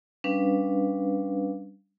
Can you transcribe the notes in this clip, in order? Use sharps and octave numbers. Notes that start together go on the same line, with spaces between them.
G3 C#4 D4 B4 F5